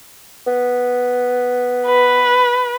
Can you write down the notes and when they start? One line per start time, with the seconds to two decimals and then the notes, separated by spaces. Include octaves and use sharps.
0.47 B3
1.87 B4